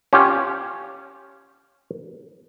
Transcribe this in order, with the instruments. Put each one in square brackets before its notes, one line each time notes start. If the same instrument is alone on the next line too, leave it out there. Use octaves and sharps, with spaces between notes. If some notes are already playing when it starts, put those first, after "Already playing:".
[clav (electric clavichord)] C#4 F4 G4